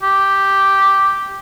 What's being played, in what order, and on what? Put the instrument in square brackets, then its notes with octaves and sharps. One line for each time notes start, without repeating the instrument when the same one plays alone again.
[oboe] G4